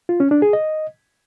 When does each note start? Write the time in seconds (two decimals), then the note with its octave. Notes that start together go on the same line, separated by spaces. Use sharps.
0.09 F4
0.20 C#4
0.31 D4
0.42 G#4
0.53 D#5